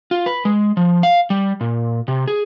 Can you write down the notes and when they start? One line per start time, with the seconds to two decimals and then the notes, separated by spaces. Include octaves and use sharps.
0.11 F4
0.26 B4
0.45 G#3
0.77 F3
1.03 F5
1.30 G3
1.61 A#2
2.08 C3
2.28 G#4